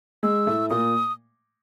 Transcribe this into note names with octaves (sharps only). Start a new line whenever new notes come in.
G#3 E6
A2 A3
A#2 A#3 D#6